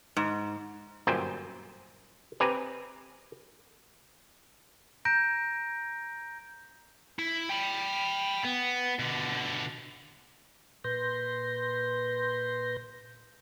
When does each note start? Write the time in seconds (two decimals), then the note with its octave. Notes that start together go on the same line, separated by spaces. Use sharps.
0.17 G#2
1.07 G1 F#2 A#2 C5 G5 G#5
2.40 C4 G4 B4 G#5 A#5
5.05 A#5 G6 A#6 D7
7.19 E4
7.50 G5 B5
8.45 B3
8.99 B2 D3
10.84 A#2 B4 C6 G6 A#6